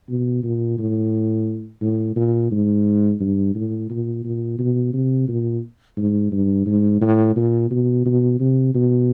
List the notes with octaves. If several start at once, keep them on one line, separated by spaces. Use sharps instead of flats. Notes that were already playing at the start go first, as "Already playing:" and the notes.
B2
A#2
A2
A2
A#2
G#2
G2
A2
A#2
A#2
B2
C3
A#2
G#2
G2
G#2
A2
A#2
B2
B2
C3
B2